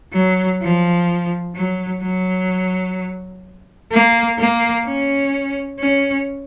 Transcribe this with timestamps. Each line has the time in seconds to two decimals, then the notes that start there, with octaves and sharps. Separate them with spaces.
0.13 F#3
0.62 F3
1.55 F#3
2.03 F#3
3.92 A#3
4.39 A#3
4.86 C#4
5.80 C#4